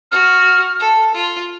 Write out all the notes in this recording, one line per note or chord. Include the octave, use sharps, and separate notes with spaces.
F#4 F6
A4
F4